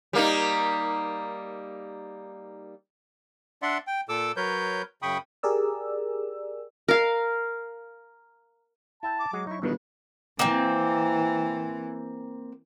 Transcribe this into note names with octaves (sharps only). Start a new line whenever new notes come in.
G3 A#3 D#4
D4 D5 E5 F#5 C6
G5
A#2 A4 D6 E6
F#3 A#4 B4 C#5 G6
F#2 C#3 G5 B5 C#6 D#6
G4 G#4 A#4 D5 E6
A#4 F5
E4 E5 G5 A5
D6
F#3 G#3 F#4 G#4
D#4 E4 C#6
G1 B2 D#3 E3 B4
E3 A#3 C4